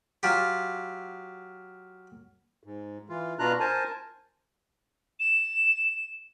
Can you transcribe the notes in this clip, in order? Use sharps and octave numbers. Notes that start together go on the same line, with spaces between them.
F#3 F4 G4
G#2
E3 F4
B2 D4 F4 A#5 F#6
A#4 C5 G#5 A5
E7